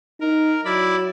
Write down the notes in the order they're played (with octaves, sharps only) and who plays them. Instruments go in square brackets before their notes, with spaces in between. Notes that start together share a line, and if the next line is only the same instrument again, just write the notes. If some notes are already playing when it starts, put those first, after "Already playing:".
[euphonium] D#4 [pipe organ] A#4
[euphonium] F#3 [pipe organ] E4 D5 B5